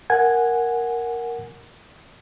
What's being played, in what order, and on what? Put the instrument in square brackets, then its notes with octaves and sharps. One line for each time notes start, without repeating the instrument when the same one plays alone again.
[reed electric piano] A#4 F#5 G#5 G#6